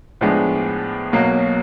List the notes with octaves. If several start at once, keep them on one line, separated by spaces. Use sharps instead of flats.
A2 F3 G#3 B3 D4
B1 B2 F#3 A#3